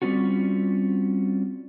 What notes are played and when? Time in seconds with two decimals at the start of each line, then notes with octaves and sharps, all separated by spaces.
0.02 G3 C4 C#4 F4 F#4